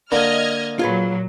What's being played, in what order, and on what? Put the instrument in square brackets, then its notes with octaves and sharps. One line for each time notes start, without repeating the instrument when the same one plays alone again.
[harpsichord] D3 A#3 [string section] D#5 F6 G#6
[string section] A#2 F#3 [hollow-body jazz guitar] F4 G#4 B4